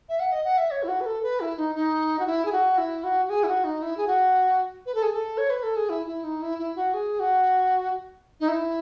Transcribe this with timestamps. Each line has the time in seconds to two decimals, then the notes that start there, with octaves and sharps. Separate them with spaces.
0.09 E5
0.20 F#5
0.32 D#5
0.44 F#5
0.58 E5
0.71 C#5
0.83 E4
0.88 F#4
1.01 B4
1.06 A4
1.23 B4
1.40 E4
1.57 D#4
1.75 D#4
2.19 F#4
2.27 E4
2.45 G#4
2.52 F#4
2.78 E4
3.04 F#4
3.26 F#4
3.30 G#4
3.43 E4
3.48 F#4
3.64 D#4
3.82 E4
3.97 G#4
4.07 F#4
4.86 B4
4.95 A4
5.03 G#4
5.13 A4
5.38 C#5
5.50 B4
5.63 A4
5.76 G#4
5.89 E4
6.06 E4
6.24 D#4
6.42 E4
6.59 E4
6.76 F#4
6.94 G#4
7.20 F#4
8.40 D#4
8.48 E4